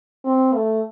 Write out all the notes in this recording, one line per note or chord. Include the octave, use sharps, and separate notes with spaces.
C4
A3